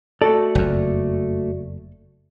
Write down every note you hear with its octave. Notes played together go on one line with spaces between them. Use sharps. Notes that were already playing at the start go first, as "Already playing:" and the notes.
A3 F#4 A4 D5
F#1 F2